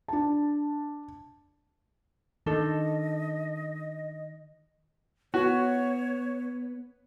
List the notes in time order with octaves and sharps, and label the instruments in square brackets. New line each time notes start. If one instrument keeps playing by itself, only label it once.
[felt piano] D4 A5
[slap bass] D#3 [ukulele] D4 A4 [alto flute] D#5
[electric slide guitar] B3 [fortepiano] F#4 [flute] C#5